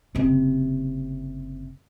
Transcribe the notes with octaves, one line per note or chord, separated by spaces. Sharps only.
F#1 C3